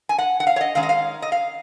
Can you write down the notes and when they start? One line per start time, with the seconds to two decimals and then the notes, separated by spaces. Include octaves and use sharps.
0.09 G#5
0.18 F#5
0.40 F#5
0.47 F5
0.56 C#5
0.61 D#5
0.75 D#3 G#3 C#4 F5
0.83 D#5
0.89 F5
1.22 D#5
1.32 F5